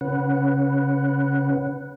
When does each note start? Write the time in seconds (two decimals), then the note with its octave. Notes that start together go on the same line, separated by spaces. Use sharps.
0.01 C#3 C#4 B4 F#5